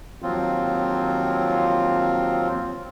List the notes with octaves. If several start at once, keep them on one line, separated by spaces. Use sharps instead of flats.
D#2 F3 F#3 C4 F4